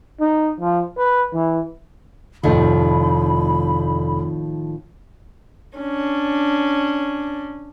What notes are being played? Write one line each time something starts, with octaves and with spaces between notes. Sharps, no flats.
D#4
F3
B4
E3
F1 A2 D#3 F3 B5
C#4 D4